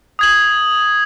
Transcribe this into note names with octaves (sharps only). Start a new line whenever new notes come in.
D#6 G#6 F#7